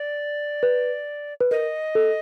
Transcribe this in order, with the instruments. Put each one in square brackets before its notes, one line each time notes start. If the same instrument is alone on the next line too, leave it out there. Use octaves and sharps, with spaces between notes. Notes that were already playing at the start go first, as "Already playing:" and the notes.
Already playing: [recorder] D5
[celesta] B4
B4
[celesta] A#4 [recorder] D#5
[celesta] A4